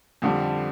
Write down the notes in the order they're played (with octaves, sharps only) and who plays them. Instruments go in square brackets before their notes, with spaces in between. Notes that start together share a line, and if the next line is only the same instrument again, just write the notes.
[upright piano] F2 D3 G3